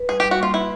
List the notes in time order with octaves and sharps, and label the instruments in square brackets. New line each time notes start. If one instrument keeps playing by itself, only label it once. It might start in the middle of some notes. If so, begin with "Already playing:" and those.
Already playing: [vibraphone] B4
[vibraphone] G3 [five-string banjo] G#4
[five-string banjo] G4
[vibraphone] G3
[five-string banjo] F#4
[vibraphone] A#3 [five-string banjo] F4
[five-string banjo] E4 [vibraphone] B4